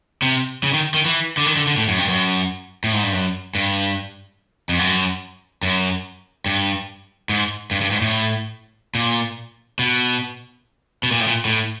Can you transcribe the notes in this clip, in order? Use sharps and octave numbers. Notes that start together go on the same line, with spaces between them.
C3
C#3
D#3
D#3
E3
D3
D#3
D3
D3
A2
F#2
G2
F#2
A2
G#2
G2
F#2
G2
F2
F#2
F#2
G2
G#2
G2
G2
G#2
A2
A#2
B2
B2
A#2
A2
A#2
A2